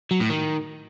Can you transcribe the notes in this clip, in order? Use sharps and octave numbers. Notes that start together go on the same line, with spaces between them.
F#3
A2
D#3